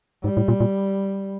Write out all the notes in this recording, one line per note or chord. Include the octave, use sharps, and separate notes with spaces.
G#2 G3
A2
A#2
A#2